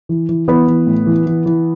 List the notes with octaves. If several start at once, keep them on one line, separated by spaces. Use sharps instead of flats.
E3
E3
E3 B3 B4
E3
A2
E3
E3
E3